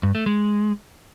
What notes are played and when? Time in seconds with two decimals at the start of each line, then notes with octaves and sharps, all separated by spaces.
0.03 G2
0.15 A3
0.26 G#3